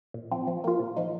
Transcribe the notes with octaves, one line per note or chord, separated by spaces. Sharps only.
A#2
F3 C4
F3
A#3 F4
A#2
F3 D#4